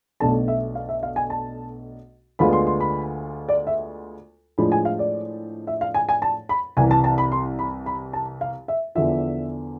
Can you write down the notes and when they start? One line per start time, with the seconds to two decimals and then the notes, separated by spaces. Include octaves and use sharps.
0.20 B1 B2 A3 D4 A5
0.48 E5
0.75 F5
0.89 E5
1.03 F5
1.16 G#5
1.30 A5
2.39 D2 D3 G#3 B3 F4 B5
2.53 C6
2.67 C6
2.80 B5
3.49 D5
3.67 E5
4.58 A2 F3 G#3 D4 B5
4.72 G#5
4.85 F5
4.99 D5
5.67 E5
5.81 F5
5.94 G#5
6.09 G#5
6.22 A5
6.49 B5
6.77 C2 C3 E3 G#5
6.91 A5
7.04 A5
7.18 B5
7.32 C6
7.59 B5
7.86 B5
8.13 A5
8.41 F5
8.68 E5
8.95 E2 D3 F3 E5